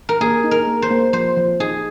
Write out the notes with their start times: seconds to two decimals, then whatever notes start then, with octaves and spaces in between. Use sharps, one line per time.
0.09 A#4
0.21 A#3 G#4
0.44 D#4
0.51 A#4
0.67 A#3
0.82 C5
0.90 A#3
1.13 F3 C5
1.37 F3
1.60 D#4 G#4